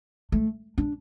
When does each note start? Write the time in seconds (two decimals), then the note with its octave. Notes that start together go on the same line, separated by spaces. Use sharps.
0.32 A3
0.78 D4